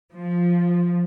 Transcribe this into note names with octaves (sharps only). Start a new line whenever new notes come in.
F3